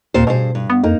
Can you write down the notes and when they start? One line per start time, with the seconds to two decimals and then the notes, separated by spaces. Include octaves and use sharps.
0.14 D#2 A#2 C4 C5
0.27 G2 B2 G#4 C5
0.55 G2
0.70 B3
0.83 F2 A#3 D#4